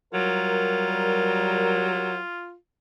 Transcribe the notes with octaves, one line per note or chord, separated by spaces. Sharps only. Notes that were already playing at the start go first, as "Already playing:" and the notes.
F#3 G3 F4 A#4